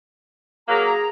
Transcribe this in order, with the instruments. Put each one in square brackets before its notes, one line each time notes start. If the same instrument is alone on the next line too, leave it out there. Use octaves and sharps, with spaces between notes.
[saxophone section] F#3 A#3 [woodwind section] G#4 A#5